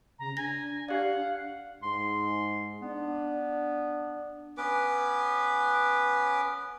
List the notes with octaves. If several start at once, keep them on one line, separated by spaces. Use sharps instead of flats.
C#3 A#5
D4 G#5 A#6
G4 D5 F5 F#5
G#2 C6
B3 D4
B3 C#4 B4 D6